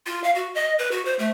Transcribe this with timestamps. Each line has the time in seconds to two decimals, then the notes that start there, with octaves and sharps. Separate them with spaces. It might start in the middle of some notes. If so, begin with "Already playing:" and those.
0.06 F4
0.24 F5
0.35 F#4
0.55 D#5
0.79 B4
0.92 F#4
1.05 C5
1.19 A3